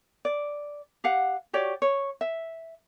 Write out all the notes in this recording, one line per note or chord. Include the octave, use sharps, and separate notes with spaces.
D5
G4 F5 F#5
F#4 G4 C#5 D5
C#5
E5